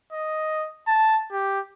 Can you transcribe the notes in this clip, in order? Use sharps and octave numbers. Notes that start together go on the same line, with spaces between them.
D#5
A5
G4